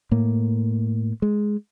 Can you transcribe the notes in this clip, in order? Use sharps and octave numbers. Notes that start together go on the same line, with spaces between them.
A2 A#3
G#3